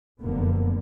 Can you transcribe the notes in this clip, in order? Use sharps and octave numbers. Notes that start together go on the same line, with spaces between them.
F1 F#2 D3 A#3 B3